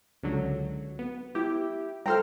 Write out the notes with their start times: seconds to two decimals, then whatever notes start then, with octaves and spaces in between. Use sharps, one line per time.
0.23 C#2 D3 F#3
0.99 B3
1.35 E4 G4
2.06 A4 C5 G5 A#5 C6 F6